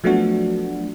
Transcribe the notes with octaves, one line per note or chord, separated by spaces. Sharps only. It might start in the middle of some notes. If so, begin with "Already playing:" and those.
F3 F#3 A3 B3 D4 F#4